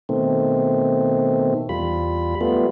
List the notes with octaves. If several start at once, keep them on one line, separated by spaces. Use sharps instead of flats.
B2 D#3 A3 C4
E2 G3 F4 B5
G3 A3 B3 F4